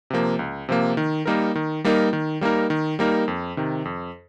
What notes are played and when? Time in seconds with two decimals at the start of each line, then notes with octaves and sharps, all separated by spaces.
0.10 C3 F3 A#3
0.39 C#2
0.69 C3 F3 A#3
0.97 D#3
1.26 G3 A#3 D#4 A#4
1.55 D#3
1.84 G3 A#3 D#4 A#4
2.13 D#3
2.41 G3 A#3 D#4 A#4
2.70 D#3
2.99 G3 A#3 D#4 A#4
3.28 F2
3.57 C3 D#3
3.85 F2